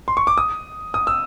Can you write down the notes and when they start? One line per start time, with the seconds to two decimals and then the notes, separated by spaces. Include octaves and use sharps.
0.08 C6
0.17 C#6
0.27 D6
0.38 D#6
0.94 D#6
1.07 E6